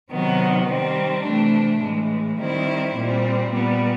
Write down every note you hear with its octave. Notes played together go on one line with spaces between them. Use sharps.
C3 D#3 F#3 B3
D#3 G3 C4
C3 E3 A3 D4
A2 E3 G#3
D#3 G3 C4 E4
A#2 G3 C4
A#2 G3 B3